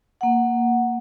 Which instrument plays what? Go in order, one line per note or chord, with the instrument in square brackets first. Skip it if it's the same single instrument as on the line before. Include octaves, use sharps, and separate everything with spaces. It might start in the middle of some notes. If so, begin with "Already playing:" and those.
[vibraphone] A#3 F#5